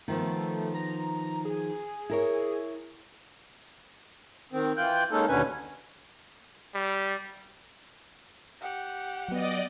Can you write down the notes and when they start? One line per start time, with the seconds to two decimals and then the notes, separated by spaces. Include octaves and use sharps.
0.08 D#3 F3 A3 B3
0.75 A#5
1.45 G#4
2.10 E4 A#4 C#5
4.53 D#3 C4
4.77 E3 F4 G5 F#6 G6
5.12 G#3 A#3 C#4 D#4 A4
5.28 D#2 B2 D3 C#4 B4 G#5
6.75 G3
8.61 G4 F#5
9.28 F#3 B3 D5 D#5